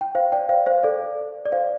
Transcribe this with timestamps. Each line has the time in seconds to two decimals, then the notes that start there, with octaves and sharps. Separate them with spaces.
0.01 G5
0.15 C5 F5
0.32 D5 G5
0.49 C5 F5
0.66 C5 F5
0.83 A4 D5
1.46 D5
1.52 C5 F5